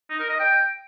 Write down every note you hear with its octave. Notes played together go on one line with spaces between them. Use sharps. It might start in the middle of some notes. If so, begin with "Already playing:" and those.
D#4
A#4
D#5
G5